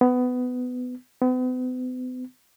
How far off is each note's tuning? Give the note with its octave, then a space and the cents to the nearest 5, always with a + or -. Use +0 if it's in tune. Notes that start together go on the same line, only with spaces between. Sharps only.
B3 +20
B3 +45